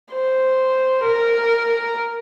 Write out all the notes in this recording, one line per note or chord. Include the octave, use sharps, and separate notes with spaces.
C5
A#4